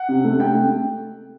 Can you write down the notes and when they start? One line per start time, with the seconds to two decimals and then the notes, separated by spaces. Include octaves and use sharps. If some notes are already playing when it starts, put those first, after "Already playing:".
Already playing: F#5
0.08 C3
0.24 A3
0.39 C3 G5
0.55 A3